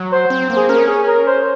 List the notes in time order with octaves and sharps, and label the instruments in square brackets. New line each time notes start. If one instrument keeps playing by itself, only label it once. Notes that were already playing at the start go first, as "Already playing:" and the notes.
Already playing: [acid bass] F#3
[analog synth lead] C5
[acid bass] C4
A#3
[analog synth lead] G#4
[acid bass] C#4 [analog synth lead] A#4
[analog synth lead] G#4
A#4
C5